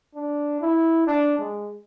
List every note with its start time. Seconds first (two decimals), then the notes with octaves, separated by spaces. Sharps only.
0.15 D4
0.61 E4
1.07 D4
1.39 G#3